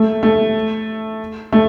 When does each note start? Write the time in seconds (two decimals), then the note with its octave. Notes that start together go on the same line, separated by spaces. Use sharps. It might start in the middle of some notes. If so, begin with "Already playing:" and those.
Already playing: A3
0.23 A3
1.52 A3